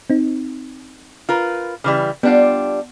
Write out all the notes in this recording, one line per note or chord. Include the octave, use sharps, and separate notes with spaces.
C4 D#4
F4 A#4 B4
C#3 E3 G3
G3 B3 D4 F4 F#5